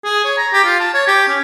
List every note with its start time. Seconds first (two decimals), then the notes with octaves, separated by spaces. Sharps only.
0.04 G#4
0.24 C#5
0.38 A#5
0.53 G4
0.65 F4
0.80 A5
0.94 C#5
1.08 G4
1.28 C#4